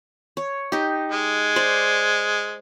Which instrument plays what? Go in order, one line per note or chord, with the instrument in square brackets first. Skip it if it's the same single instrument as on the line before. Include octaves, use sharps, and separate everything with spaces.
[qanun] C#5
D#4 G4
[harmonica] G#3
[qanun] C5 D5